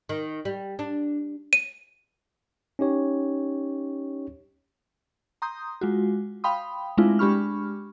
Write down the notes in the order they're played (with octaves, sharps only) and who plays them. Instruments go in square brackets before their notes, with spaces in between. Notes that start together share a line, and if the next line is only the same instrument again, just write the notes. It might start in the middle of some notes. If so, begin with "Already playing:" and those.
[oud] D#3
G3
D4
[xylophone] D#7
[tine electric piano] C#4 D#4 G4 C#5
[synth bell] A#5 C6 D#6 G6
G#3 F4 F#4
F5 G5 B5 C6 D#6
G#3 A3 C4 D4 E4 F4
G#3 D4 G4 B5 C#6 F6